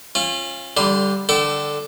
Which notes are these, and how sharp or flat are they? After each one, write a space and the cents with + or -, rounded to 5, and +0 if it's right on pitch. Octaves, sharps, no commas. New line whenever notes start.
C#4 -35 F4 -10
D3 -20 G3 +0 C6 -5
D3 +5 A4 +0 G5 -35